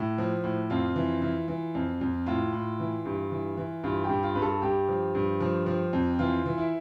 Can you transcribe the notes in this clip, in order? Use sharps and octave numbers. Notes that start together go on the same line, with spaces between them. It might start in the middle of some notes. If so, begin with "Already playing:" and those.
Already playing: A2 E4
F3
A2
F2 F4
E3
E3
E3
F2
F2
A2 F4
A2
E3
G2
E3
E3
G2 F4
G4
G2
F4
G2 B4
A4
G2 G4
F3
G2
F3
F3
F2
E3 F4
E3
E4